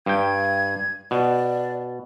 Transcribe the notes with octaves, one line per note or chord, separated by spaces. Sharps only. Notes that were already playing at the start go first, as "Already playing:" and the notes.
G2 G5 G#6
B2 D5